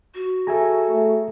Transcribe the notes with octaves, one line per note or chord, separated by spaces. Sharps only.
F#4
G#4 A4 E5 G#5 A#5
A3